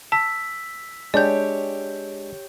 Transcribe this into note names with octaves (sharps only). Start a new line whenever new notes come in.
A5 E6 B6
G#3 D4 G4 C#5 D5 G6